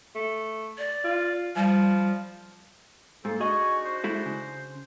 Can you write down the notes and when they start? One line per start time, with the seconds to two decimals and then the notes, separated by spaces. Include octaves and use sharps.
0.15 A3
0.78 D5
1.05 F4
1.56 F3 G3
3.25 G#2 A#3 A4 C5
3.40 D4 D#4 F#4 G#4 D#5 C#6
3.85 C5
4.04 G#3 E4 A4
4.26 C#3